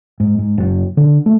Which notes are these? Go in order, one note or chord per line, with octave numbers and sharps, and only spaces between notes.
G#2
G#2
F#1
D3
A3